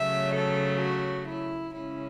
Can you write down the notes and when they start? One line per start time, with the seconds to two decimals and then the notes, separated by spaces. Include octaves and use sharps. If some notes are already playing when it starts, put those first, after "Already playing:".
Already playing: C#3 F#3 A3 E5
0.34 A4
0.81 F#4
1.27 E4
1.74 C#3 G#3 C#4 E4